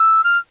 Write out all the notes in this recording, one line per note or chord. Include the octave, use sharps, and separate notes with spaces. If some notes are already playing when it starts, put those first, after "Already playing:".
Already playing: E6
F6